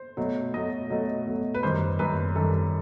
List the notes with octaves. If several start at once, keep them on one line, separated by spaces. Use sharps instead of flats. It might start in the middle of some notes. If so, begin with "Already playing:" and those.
Already playing: C5
B2 F#3 A3
B2 F#3 A3 D#5
B2 F#3 A3
B2 F#3 A3
B4
F#2 D#3 G3 C5
F#2 D#3 G3 B4
F#2 D#3 G3 A4